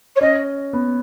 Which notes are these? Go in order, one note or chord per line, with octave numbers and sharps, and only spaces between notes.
C#5
C#4 D#5
B3